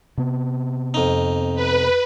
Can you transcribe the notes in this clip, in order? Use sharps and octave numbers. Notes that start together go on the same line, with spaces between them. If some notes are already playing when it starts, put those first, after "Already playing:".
C3 B3
F2 D#4
B4